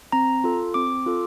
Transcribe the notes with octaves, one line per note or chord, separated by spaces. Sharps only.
C4 A#5
F4 A4
C4 D6
F4 A4